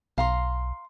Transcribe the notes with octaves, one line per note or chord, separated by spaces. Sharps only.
B1 F5 A#5 C6